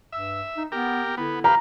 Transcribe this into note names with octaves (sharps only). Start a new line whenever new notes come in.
G2 E5 E6
D#4
B3 G4 A#4
D3 B3 E4
G4 B4 F5 A#5